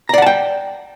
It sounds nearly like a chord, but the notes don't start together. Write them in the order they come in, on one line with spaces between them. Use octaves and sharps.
A#5 D5 F#5 A5 G5